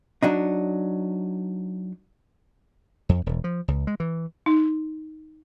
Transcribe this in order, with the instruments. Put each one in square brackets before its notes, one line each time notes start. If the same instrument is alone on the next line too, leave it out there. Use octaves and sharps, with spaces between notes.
[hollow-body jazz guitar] F#3 D4 D#4
[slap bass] F2
E1
F3
C#2
G#3
E3
[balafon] D#4